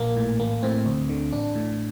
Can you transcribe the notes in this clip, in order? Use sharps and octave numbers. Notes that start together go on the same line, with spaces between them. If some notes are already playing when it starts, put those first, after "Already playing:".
Already playing: A#1 A#3
A2
A1 A#3
A2 C4
D2
D3
A1 D4
A2